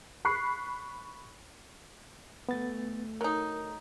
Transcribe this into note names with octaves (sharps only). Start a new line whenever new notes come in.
B5 C#6 F#6 C7
D2 A3 B3 A6
F#3 D#4 A#4